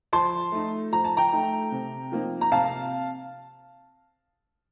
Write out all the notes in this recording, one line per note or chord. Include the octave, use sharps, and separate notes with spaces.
F3 A5 C6
A3 D#4
F3 A#5
A5
G5 A#5
A3 D#4
C3
F3 A#3 D#4
A#5
C3 F5 A5